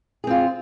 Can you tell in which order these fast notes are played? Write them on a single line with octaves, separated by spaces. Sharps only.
G#4 C4 F4